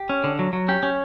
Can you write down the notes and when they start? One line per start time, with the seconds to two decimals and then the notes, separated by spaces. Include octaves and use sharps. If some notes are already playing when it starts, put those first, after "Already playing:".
Already playing: G4
0.09 C#4
0.24 D3
0.39 F#3
0.53 F#3
0.68 C#4 G4
0.83 C#4